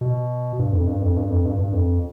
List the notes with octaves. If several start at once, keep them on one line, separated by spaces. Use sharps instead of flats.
B2
G2
F2
G2
F2
G2
F2
G2
G2
F2